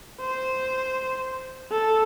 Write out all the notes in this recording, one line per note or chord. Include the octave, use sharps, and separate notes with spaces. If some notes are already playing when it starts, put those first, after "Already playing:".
C5
A4